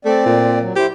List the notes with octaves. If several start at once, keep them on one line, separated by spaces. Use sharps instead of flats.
A3 C4 D5
A#2
F#3
E4 G4 C5